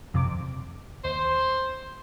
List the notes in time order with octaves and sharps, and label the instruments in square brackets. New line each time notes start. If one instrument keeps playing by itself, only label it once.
[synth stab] F2 C3 D6
[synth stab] D#2 [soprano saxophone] C5